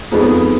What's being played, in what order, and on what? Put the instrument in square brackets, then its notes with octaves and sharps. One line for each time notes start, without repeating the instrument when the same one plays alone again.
[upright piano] F2 F3 G#3 B3 D#4